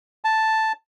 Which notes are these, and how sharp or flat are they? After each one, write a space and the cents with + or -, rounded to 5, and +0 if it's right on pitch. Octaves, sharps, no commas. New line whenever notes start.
A5 +0